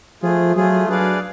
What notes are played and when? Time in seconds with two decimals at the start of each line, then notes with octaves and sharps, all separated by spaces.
0.23 F3 A3 F4 G#4
0.56 F#3 A3 F4 G#4
0.88 F#3 D4 G#4 B4 D5 F5